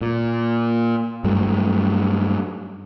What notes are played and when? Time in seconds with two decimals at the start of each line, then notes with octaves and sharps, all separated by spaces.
0.01 A#2
1.24 G2 F#3 A3